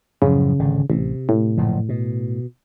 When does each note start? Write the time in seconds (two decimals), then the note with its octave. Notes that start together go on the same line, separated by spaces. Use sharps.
0.22 F#2 A2 C#3 F3
0.59 G#1 D3
0.90 A1 C3
1.29 A2
1.57 F#1 A#2 F3
1.89 B2